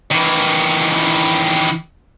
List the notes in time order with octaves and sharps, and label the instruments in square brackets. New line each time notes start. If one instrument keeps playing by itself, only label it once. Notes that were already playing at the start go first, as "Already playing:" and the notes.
[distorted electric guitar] D#3 E3